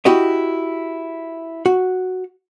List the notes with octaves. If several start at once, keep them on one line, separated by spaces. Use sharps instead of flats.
E4 F#4 G4 D#5
F#4